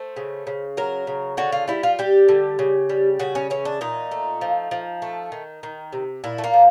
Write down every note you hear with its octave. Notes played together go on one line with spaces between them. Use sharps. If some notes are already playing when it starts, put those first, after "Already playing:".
Already playing: A3 C5
C#3
C#3
F#3 A#4
C#3
D3 F#4
F4
G3 E4
F4
G3 G4
D3
C#3
G3
C#3 F#4
C#4
E3 C#4
D4
A#2 D#4
A3
F3
F3
A3
D#3
D#3
C3
A#2 E4
A3
A#3
F3